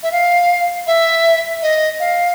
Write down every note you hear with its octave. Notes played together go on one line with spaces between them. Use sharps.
E5
F5
E5
D#5
F5